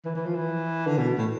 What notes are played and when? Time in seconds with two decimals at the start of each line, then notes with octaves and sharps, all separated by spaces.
0.05 E3
0.15 E3
0.26 F3
0.36 E3
0.87 D3
0.98 B2
1.18 A2